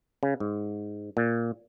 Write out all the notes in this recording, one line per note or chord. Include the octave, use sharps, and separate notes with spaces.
C#3
G#2
A#2